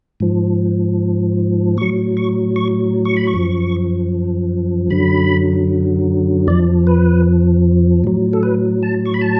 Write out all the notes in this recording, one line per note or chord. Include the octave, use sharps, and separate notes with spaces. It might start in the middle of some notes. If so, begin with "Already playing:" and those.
G#2 F3
A2 F#3 C#6
C#6
C#6
C#6
B5
C#6
F#2 F3
F#2 D3 F#3 B5
F2 F3 D5
B4
A2 F#3
A4
B4
A5
C#6
B5
A5